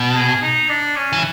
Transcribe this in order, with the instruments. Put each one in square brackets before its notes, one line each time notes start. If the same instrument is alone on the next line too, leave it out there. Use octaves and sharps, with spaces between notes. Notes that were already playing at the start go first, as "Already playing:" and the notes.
Already playing: [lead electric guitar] B2
[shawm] G#4
D#4
D4
C#4
[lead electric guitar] E3